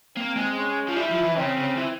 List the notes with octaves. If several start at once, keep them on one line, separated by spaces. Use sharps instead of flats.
A#3 C4
G#3
C#4
F3
G3 E4
F3
E3
C#3 C4
C#3
E3